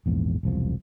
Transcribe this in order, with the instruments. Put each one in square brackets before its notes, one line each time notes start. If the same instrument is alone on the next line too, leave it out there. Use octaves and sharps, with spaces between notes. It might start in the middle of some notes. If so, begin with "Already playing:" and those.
[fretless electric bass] A#1 E2 G#2
E1 C2 F3